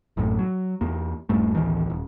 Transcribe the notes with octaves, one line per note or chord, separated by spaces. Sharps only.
A1 F#2 A2
F#3
E2 A#3
D#1 G2 A3
A1 D2 D#3 E3
D#1